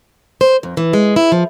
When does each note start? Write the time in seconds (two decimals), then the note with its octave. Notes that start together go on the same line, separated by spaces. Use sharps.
0.41 C5
0.63 F2
0.77 E3
0.93 G#3
1.16 E4
1.32 F3